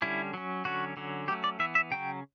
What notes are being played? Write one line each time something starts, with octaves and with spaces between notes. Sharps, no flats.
D3 G3 C#4 E4
F#3 C#4
D3 F#3 C#4 F#4
D3 F#3 C#4
F#3 A3 C#4 G4
D5
E3 B3 E5
E5
C#3 F#3 C#4 G5